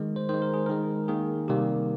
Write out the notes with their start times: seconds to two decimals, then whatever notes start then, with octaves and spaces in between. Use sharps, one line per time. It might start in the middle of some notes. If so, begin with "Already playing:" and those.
Already playing: D#3 G#3
0.16 C5
0.29 D#3 G#3 C5
0.42 A#4
0.54 G#4
0.66 D#3 G#3 A#4
1.08 D#3 A#3 G#4
1.48 C3 D#3 G3 A#3 G4